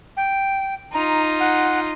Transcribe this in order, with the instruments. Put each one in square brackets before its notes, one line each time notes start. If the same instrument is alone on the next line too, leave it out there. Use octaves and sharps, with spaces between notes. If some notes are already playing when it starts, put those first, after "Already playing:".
[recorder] G5
[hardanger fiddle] D#4 F4 [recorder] A#5
[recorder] F#5